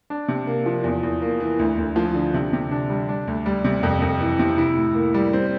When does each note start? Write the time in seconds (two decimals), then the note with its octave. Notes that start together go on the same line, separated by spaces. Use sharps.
0.10 D4
0.28 C3
0.47 A#3
0.66 F3
0.84 E2
1.03 E2
1.22 A#3
1.40 E3
1.59 D2
1.78 D2
1.96 F3
2.14 D3
2.34 C3
2.53 C3
2.71 D4
2.90 G3
3.09 D4
3.28 D2
3.46 G3
3.64 C3
3.83 F2
4.02 F2
4.21 E3
4.39 C3
4.58 E4
4.77 A2
4.95 A#3
5.14 G3
5.33 C4